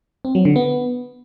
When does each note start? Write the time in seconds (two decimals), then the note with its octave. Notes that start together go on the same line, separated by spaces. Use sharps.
0.25 C4
0.35 F#3
0.45 D3
0.56 B3